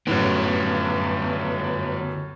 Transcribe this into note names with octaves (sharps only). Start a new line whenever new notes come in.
F#2 A2 D3 B3